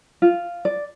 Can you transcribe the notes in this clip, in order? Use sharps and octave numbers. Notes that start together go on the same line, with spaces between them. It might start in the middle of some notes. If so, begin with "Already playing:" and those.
F4
D5